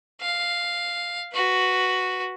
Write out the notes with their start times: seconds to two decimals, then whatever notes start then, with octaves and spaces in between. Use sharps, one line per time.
0.21 F5
1.34 F#4 B4